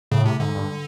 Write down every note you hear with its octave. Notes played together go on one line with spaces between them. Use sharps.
A2 C#3
C3
G#2 D3
G2